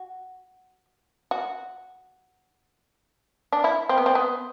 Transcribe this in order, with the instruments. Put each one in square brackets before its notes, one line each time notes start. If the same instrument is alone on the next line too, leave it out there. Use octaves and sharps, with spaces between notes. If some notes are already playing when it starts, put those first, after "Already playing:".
Already playing: [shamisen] F#4
F#4
D4
E4
C4
B3
C4
B3